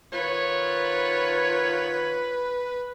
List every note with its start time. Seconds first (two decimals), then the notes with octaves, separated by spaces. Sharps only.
0.12 D#3 B3 F4 B4 C#5